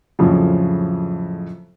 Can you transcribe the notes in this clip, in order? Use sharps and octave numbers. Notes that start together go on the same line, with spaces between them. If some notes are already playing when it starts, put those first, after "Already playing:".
F2 A2 C#3 F3 F#3